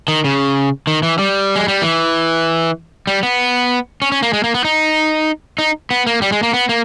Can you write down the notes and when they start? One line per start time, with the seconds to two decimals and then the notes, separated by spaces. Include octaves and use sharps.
0.08 D#3
0.24 C#3
0.87 D#3
1.03 E3
1.19 G3
1.56 G#3
1.68 G3
1.82 E3
3.07 G3
3.23 B3
4.02 C#4
4.12 C#4
4.23 A#3
4.33 G#3
4.44 A#3
4.54 B3
4.64 D#4
5.59 D#4
5.91 B3
6.07 A#3
6.22 G3
6.32 G#3
6.43 A#3
6.53 B3
6.69 A#3